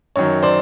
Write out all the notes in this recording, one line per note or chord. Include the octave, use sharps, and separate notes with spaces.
F#2 D#3 F#3 C#5
C5 D5